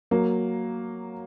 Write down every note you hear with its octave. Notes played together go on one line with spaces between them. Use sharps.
F#3 A#3